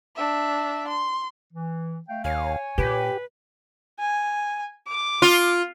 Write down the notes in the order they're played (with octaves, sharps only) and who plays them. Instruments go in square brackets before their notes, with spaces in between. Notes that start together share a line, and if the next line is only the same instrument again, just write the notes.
[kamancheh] D4 E5
C6
[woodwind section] E3
A3 F5 G5
[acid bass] D#2 [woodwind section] C#5 G#5 [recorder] F5
[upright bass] A#2 [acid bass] G4 [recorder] B4
[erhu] G#5
D6
[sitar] F4